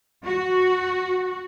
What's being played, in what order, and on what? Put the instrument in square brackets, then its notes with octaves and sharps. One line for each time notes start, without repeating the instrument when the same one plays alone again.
[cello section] F#4